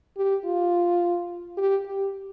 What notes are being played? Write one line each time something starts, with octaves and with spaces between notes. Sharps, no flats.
G4
F4
G4
G4